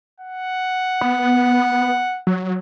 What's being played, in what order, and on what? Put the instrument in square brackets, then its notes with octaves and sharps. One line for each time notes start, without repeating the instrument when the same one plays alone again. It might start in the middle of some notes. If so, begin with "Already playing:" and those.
[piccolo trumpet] F#5
[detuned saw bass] B3
F#3